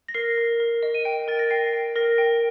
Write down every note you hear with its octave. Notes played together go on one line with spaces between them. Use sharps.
A#6
A#4 C7
A#4
A#4
D#5
D#7
G5 D7
A#4 A6
A#6
G5 C7
G5
A#4 A#6
G5